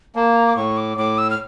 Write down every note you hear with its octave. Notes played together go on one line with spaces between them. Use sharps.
A#3 A5
A#5
D6
A2 C#6
D6
A2 D6
E6
F6